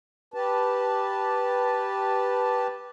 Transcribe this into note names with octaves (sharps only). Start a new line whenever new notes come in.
G4 B4 A5